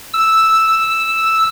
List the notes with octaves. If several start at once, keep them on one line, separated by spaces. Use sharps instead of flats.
E6